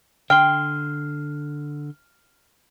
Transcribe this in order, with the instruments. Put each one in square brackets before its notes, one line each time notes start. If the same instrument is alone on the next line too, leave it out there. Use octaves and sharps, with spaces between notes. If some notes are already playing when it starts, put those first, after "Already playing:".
[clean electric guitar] D3 C6 [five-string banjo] G5 [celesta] F6